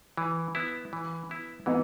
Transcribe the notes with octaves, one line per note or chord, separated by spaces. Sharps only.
E3
B3 E4
E3
B3 E4
E3 B3 D#4